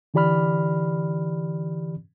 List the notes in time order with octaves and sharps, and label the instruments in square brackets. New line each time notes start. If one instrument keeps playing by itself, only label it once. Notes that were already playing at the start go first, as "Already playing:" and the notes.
[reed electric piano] D3 E3 G4 D5 B5 F6